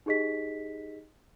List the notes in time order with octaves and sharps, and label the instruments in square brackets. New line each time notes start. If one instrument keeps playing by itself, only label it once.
[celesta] D#4 G4 G#4 D#5 B6